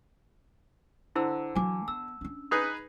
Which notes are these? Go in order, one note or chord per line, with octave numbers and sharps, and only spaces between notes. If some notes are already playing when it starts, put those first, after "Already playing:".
D3 E4 C5 E6
E3 F#3 G#5 D6
B3 E6
C#4 D4
D#4 G#4 B4